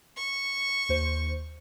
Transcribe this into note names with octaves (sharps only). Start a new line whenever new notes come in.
C#6
D#2 C5